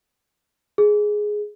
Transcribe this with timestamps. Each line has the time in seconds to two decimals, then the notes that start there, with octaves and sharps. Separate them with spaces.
0.78 G#4